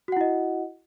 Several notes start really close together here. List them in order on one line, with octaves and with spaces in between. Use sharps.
F#4 F#5 E4 D#5